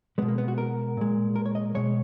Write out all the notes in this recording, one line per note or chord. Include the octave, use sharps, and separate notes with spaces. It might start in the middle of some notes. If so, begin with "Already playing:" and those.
B2 G#3 B3
A#3
B3
F#4
A#4
A#2 G#3
A#4
C#5
D#5
B2 G#3 C#5